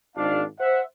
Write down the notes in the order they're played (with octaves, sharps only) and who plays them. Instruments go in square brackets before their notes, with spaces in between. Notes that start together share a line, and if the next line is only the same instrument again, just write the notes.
[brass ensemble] G#1 D4 F5
C5 E5 F#5